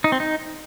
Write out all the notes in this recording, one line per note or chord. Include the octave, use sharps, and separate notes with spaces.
D#4
C4
D#4